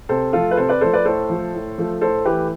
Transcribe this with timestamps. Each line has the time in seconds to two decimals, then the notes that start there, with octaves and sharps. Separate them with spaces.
0.09 C3 A4 C5
0.33 F3 A3 F4 A4
0.51 B4
0.57 C3 A4 C5
0.69 B4 D5
0.81 F3 A3 A4 C5
0.93 B4 D5
1.05 A2 A4 C5
1.29 F3 A3
1.53 A2
1.78 F3 A3
2.01 A2 A4 C5
2.25 E3 A3 G4 B4